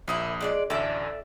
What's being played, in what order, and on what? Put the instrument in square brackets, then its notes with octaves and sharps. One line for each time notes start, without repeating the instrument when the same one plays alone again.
[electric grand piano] A#1 D#6 [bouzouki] A#2 A#3 E4
[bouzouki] G#3 D4 D5
[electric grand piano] A1 D2 [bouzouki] A4 D5 E5